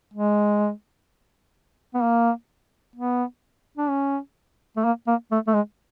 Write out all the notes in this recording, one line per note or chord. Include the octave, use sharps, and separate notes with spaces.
G#3
B3
A#3
B3
D4
C#4
A3
A#3
A#3
A3
A3
G#3